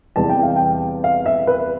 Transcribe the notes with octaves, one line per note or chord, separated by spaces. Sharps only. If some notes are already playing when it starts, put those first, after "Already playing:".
E2 C3 G3 B3 A5
G5
F5
G5
F5
E5
B4